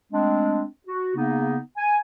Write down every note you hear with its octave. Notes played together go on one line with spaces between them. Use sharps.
G#3 A3 C4 D4
F#4
C#3 A#3 B3 D#4
G#5